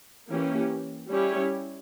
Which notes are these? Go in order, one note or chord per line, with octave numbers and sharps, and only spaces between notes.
E3 A#3 C#4 G4
G3 C#4 E4 G4 C#5